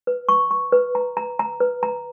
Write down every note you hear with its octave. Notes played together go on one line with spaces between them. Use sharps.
B4
C#6
C#6
B4
A#5
A#5
A#5
B4
A#5